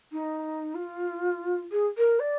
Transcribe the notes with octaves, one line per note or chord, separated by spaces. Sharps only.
D#4
F4
G#4
A#4
D5